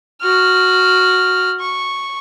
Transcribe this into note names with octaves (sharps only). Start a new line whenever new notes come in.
F#4 F6
C#6